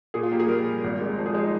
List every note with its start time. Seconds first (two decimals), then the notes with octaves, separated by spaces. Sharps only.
0.14 A#2 G#4
0.23 F4
0.32 A#3 G4
0.39 G#4
0.48 G3 A#4
0.66 G3
0.84 G#1
1.01 G#3
1.18 F3 C5
1.26 G#4
1.34 G#3
1.44 D#4